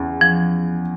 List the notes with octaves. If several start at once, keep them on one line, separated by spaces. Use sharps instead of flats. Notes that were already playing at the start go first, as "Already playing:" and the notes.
Already playing: E2 C#3
F3